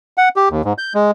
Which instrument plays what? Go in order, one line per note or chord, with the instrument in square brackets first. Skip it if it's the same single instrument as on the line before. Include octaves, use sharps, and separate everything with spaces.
[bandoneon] F#5
G4
D#2
G#2
G6
G#3